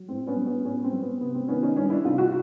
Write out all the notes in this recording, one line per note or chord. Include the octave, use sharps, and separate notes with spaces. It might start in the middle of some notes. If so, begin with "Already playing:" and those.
Already playing: F#3
A2 C4
B3 C#4
F#3
B3 C#4
A2 B3 C#4
C4
F#3
B3
C3 B3
C4
D#3 B3 C#4
C#4 D#4
G3 C#4 D#4
D4 E4
C3 D#4 F4
E4 F#4